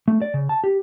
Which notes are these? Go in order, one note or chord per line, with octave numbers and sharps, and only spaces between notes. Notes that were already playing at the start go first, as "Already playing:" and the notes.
A3
D5
C#3
A5
G4